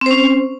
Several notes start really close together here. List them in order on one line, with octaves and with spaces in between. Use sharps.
C4 C5 C#4